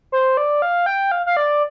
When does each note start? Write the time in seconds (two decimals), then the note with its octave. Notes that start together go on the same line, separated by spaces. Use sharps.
0.12 C5
0.37 D5
0.62 F5
0.86 G5
1.12 F5
1.26 F5
1.37 D5